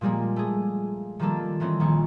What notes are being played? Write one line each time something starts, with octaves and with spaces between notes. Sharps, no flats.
A#2 F3 G3 G#3 A#3
A3 G#4
D#3 F3 G3 A#3 D4 A4
D#3 E3 C4 C#4
A#1 D#3 C#6